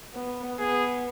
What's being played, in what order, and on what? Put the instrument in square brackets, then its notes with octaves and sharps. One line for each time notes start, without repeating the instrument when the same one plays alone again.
[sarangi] B3
[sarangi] B3 [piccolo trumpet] G#4